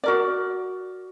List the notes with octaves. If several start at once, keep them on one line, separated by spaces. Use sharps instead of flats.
F#4 A#4 D5